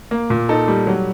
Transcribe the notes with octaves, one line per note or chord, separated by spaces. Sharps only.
A#3
A#2
D#4 A4
G3
F#3